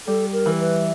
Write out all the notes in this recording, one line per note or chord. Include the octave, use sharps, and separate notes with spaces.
G3 A4
A#4
E3
B4